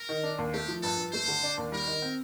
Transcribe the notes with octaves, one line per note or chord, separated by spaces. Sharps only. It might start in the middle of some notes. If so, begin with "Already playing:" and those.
Already playing: A#4
D#3
D4
D#2
A3 G4
F3
G2 A4
G2
A3 C5
D3
D4
D#2
G3 A#4
D#3
C4